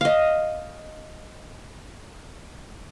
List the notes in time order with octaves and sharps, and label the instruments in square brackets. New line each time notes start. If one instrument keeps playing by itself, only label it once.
[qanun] D#5 F5